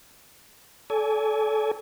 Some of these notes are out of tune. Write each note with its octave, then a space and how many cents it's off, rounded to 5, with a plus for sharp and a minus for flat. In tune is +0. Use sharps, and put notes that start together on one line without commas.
A4 -25 D5 -40 G#5 +0